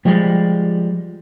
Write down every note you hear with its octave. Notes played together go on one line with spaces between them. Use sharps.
F3 G3 G#3